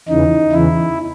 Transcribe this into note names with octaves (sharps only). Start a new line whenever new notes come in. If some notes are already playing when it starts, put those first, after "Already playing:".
E2 C#3 E3 D#4
E2 C#3 E3 E4